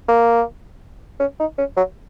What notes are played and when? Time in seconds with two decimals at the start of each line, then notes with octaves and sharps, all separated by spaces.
0.09 A#3
1.20 C#4
1.40 D#4
1.59 C#4
1.77 F#3